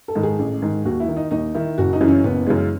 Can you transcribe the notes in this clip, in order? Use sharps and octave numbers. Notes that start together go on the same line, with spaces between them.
A4
G#2 D#3
G#4
A1
G#2 D#3
D#2 F#4
E4
D#3
D#4
D#2 D#4
D#3 E4
F#1 F#4
D#4
F#2 C#3 E3
C#4
F#1 B3
F#2 C#3 E3 G#3